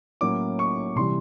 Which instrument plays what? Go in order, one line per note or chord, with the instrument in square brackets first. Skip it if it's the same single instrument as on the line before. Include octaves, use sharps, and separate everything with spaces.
[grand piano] A2 F#3 A#3 C#4 E4 D6
C#6
C3 E3 G3 C6